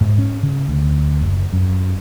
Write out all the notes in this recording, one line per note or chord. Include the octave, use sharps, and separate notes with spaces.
G#2
C#4
C#3
D2
F#1
F#2